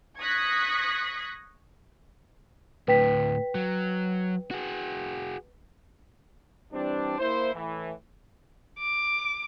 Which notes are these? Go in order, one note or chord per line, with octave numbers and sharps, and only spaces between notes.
C#6 D#6 F#6 G#6 A#6 B6
D2 A2 B4 G5 B6
F#3
F#4 G#4
E3 G3 C4 D4
A#3 E4 C5
A2 E3
D6